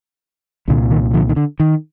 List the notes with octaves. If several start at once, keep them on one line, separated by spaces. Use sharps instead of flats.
C2 A#2 D3
D#3
D3 F3
D#3
D3
D#3